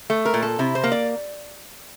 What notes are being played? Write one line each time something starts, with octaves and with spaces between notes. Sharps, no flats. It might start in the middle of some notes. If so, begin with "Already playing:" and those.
A3
A#4
A#2
A4
C3 E4
C5
A#3
D5